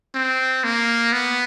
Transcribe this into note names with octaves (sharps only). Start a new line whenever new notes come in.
C4
A#3
B3